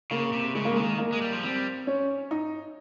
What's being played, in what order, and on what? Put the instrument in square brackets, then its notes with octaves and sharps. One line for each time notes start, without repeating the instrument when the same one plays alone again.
[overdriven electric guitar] C#3 [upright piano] A#3
[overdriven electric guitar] C3
[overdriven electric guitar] C#3 [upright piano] G#3
[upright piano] A#3
[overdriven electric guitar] D#3 [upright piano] G#3
[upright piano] A#3
[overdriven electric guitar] G#3
G3
F3
[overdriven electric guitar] G3 [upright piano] C4
[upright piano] C#4
D#4